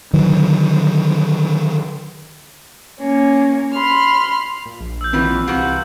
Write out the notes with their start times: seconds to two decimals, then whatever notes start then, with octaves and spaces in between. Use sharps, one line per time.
0.13 D3 D#3 F#3
3.00 A#3 C#4
3.74 B5 C6 F6
4.66 A#2
4.80 A#1
5.01 E6 G6
5.13 D#3 E3 F#3 C4 F4 A#4
5.48 C2 C3 E3 F#4 A#4 B4 F5